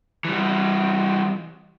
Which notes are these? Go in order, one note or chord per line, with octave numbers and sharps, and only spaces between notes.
E3 G3